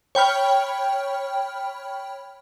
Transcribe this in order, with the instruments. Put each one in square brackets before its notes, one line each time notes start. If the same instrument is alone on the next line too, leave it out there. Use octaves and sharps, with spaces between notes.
[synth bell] C#5 G5 B5 F6